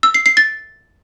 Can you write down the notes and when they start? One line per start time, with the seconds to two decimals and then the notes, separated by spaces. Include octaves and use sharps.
0.03 E6
0.14 C7
0.26 C7
0.37 A6